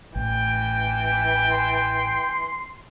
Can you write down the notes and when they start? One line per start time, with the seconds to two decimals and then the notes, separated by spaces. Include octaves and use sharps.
0.16 A1 E3 G5
1.51 C6